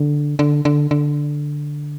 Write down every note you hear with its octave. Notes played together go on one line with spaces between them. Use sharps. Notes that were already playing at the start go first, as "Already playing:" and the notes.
Already playing: D3
D3
D3
D3